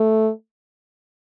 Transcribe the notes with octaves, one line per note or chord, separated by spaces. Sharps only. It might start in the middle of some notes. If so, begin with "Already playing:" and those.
Already playing: A3